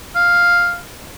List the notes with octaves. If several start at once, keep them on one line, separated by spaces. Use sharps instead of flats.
F5